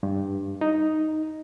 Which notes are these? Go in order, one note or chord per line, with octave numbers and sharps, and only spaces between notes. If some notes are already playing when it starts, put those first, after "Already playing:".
G2
D#4